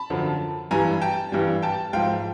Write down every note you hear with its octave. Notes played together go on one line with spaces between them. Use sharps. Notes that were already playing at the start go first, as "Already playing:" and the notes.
Already playing: A5 B5
F#2 D3 F3
G2 E3 G3 G#5 A#5
G5 A5
G2 E3 G3
G5 A5
G#2 F3 F5 G5